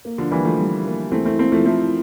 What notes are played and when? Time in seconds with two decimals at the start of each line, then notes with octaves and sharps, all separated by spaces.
0.05 A#3
0.18 D3 F3
0.31 E3 G3 A#3
0.45 F3 A3
0.59 G3
0.85 A#3
1.12 E3 A3 C4
1.25 A3 C4
1.39 A3 A#3 C4
1.52 F3 A3
1.65 F3 A3 E4